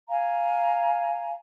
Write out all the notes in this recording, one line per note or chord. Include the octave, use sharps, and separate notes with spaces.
F5 G#5 A#5